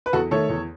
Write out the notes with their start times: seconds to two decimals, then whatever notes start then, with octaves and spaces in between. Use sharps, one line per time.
0.06 B4
0.13 E2 F#4 A4
0.31 D#3 A3 A4 C#5
0.49 E2